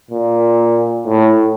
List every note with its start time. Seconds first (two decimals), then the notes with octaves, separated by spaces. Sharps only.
0.11 A#2
1.07 A2